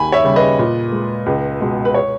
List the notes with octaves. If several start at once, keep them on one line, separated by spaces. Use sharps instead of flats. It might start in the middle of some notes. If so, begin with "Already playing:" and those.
Already playing: D#2 G#5 B5
C#5 E5
C#3 G3
B4 D#5
A#2
G#3
C#2
B2 G#3
B4
C#5